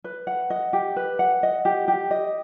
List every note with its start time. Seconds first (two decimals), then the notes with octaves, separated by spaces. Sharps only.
0.04 B4
0.27 F#5
0.50 D#5
0.73 G4
0.96 B4
1.19 F#5
1.43 D#5
1.65 G4
1.88 G4
2.11 D#5